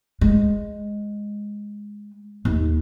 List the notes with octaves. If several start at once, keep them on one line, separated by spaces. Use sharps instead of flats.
G#3
D#2